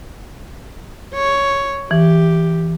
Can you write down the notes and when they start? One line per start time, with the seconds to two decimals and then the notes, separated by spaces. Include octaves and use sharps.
1.14 C#5
1.91 E3 G4